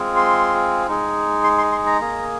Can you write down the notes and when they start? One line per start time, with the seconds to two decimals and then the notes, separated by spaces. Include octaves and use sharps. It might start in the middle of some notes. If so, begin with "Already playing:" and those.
Already playing: G#3 C4 F4 G#4
0.16 C6
0.87 G#3 D#4 G#4
1.44 C6
1.58 C6
1.72 C6
1.86 A#5
2.01 A#3 G#4